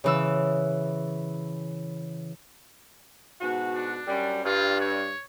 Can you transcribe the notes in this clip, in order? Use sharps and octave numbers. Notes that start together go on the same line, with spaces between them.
C#3 E3 E6
G#2 B2 F#4
D4
F#2 G3
G2 F4
C#5